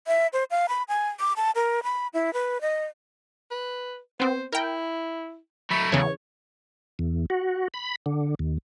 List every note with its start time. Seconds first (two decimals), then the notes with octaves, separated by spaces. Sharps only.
0.07 E5
0.33 C5
0.51 F5
0.69 B5
0.88 G#5
1.20 D6
1.37 A5
1.55 A#4
1.83 B5
2.14 E4
2.33 B4
2.61 D#5
3.51 B4
4.20 B3 C4 C5
4.53 E4 A#4 G5
5.71 F#3 A3 B5
5.92 E2 C#3 C#5
6.99 E2
7.30 F#4
7.74 B5
8.06 D3
8.39 D#2